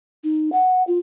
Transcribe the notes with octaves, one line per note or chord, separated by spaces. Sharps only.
D#4
F#5
F4